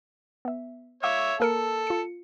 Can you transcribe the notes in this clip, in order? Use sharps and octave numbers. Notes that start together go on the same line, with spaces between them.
B3 E5
C#5 E5 F5 D6 E6
A#3 A4 A#4 C#7
F4 C#7